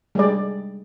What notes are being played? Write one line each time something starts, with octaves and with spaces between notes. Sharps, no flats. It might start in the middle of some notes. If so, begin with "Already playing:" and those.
G3 G#3 G#4 D5